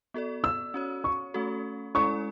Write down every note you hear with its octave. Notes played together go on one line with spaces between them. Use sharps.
B3 F#4 A4 D5
E6
C#4 F#4 C#5
C#6
A3 C#4 F#4 A4
G#3 C#4 E4 A4 D5 C#6